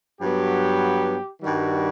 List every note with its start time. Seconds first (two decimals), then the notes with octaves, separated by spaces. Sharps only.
0.20 G2 F#3 B3 G4
1.40 G2 D#3 G3 F#4